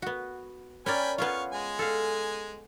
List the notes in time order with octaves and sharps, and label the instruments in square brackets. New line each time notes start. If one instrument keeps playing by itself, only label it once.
[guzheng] B3 F#4
[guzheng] C#4 A#4 D5 [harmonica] G5 G#5 B5
[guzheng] B3 C#4 F4 [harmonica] F5 C#6
[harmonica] G#3 G#5
[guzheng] A4 F5